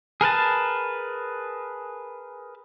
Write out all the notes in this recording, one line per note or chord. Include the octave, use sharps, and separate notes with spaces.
G#4 A#4 B4 A5